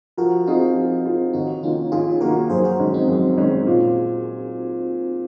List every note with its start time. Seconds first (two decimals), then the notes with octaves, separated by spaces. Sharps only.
0.18 F3 F#4 A#4
0.46 C4 D#4 F4 F#4 G#4
0.75 F3
1.05 C4 F4 G#4
1.33 D#2 D#4 F#4
1.63 D#3 A#3 C#4 F4
1.92 D#2 F4 G#4
2.21 D#3 A#3 F#4 A#4
2.50 F#2 G#4 C5
2.64 F#4 A#4
2.79 D#3 G#3 C#4
2.94 C4 D#4
3.08 F#2
3.37 D#3 G#3 C#4
3.67 A#2